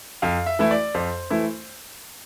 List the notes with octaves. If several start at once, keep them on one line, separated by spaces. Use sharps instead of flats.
F2 F5
E5
E3 A3 E4
D5
F2 C5
E3 A3 E4